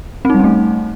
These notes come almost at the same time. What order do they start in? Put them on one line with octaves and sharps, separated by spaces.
C4 D#4 G3 C#4 A3